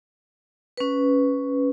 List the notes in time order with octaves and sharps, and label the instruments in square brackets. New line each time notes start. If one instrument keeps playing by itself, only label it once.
[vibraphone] C#4 B4